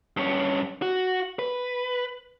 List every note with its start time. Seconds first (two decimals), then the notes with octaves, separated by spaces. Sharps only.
0.17 G2 C#4
0.82 F#4
1.39 B4